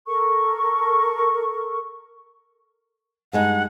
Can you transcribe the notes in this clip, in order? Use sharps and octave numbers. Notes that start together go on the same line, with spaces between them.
A4 A#4 C#6
G2 G#3 D#4 F#5